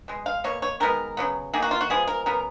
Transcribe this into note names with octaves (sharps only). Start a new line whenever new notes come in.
B2 G#3
F5
B2 A#3 C#5
C#5
D#3 G#3 B3 A#4
C#3 F#3 B3
D#3 A#3 G#4
F#4
F4
F#4
F3 G#3 B3 G#4
A#4
C#3 F#3 B3 A#4